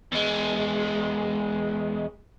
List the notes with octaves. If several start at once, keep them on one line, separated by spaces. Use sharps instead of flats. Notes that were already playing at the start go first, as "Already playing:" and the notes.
E2 G#3